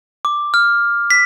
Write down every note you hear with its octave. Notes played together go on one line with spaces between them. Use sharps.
D6
F6
B6